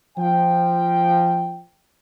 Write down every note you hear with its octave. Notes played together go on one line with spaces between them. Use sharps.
F3 G5